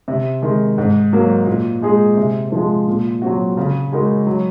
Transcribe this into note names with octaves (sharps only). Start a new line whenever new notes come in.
C3
D#3 G#3
G#2
F#3 A#3
A#2
G#3 D#4 G#4
C3
F3 G#3
A#2
F#3 C4 F#4
C#3
G#3 D#4 F#4 A#4
F#3